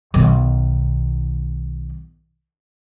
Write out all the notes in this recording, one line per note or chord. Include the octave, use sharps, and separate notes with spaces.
B1 D#3